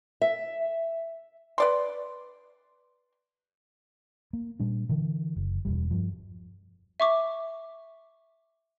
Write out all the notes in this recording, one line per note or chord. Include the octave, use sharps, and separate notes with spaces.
E5
B4 D5 C6
A#3
A#2 G3 D4
D3 E3
F#1
E1 C#2 G3
G2 F3
E5 C#6 D6